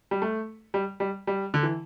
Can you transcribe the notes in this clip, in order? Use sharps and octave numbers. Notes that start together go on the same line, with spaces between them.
G3
A3
G3
G3
G3
D3
E3